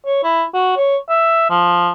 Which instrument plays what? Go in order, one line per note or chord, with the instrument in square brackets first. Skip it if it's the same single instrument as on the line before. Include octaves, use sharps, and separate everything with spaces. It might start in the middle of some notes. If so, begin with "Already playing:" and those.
[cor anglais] C#5
E4
F#4
C#5
E5
F3